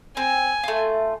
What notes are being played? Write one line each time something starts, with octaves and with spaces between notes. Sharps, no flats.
C4 G#5
A3 F4